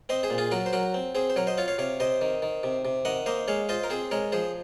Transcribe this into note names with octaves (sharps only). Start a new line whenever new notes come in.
C4 C5 D#5
G#4 C5
A#2
F4 G#4
F#3 F#4 A#4
C5
F#3 F#4 A#4
C4
C4 G#4 C5
C5
F#3 A#4 C#5
C5 D#5
F4 C#5 F5
C#5 F5
C3 C#5 F5
C3 C5 D#5
D#3
D#3
C3
C3
D#3 D#5 F#5
A#3 C5 D#5
G#3 C#5 F5
F4 C5 D#5
A#4
C4 G#4 C5
G#3 A#4 C#5
F3 G#4 C5